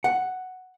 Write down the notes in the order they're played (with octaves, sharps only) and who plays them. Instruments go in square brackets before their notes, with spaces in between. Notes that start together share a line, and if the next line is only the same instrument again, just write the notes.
[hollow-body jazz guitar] F#5